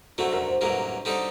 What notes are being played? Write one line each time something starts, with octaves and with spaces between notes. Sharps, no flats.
D3 F#3 A3 C4 F#4
A#4
C5
A1 G2 D3 F#3 A#3 A#4
D3 G3 C4 D#4 A4